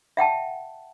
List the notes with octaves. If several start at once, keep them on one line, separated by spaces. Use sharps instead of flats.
E5 F#5 G5 A5